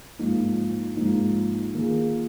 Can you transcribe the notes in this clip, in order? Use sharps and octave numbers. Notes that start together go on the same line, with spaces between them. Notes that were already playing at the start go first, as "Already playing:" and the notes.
G#2 F3 A#3 D#4
G#2 F3 A#3 D#4
D#3 A#3 F4 G#4